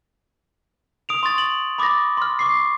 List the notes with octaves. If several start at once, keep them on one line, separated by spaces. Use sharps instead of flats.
D#6 D7 F7
C6 C#6 D#6 A6
F#7
B5 D6 D#6 A6 A#6
C6 F6
C#6 D6 C7